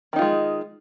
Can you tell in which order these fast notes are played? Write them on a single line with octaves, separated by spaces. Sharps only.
D#3 D#4 F4 G#3